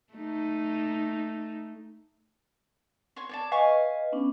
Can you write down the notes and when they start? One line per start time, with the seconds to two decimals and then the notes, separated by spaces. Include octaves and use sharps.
0.13 A3 D#4
3.16 C#5 C6 C#6
3.29 C#5 D5 A5
3.52 B4 D#5 F5 G#5 C#6
4.12 B3 C#4 D4